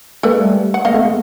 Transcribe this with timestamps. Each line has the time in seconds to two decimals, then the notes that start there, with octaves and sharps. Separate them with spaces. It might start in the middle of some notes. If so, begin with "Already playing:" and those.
0.23 G#3 A#3 A4 B4
0.38 G3 A3
0.74 F#5
0.85 G#3 A#3 D#5 F5
0.94 A3 B3
1.05 G#3 A#3